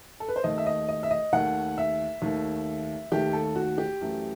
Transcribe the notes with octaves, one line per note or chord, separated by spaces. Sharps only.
A4
B4
C5
D#2 D#3 A3 D#5
E5
D#5
D#5
E5
D#5
D#2 D#3 A3 F#5
E5
D#2 D#3 A3
D#2 D#3 A3 G4
A4
F#4
G4
F#2 E3 A3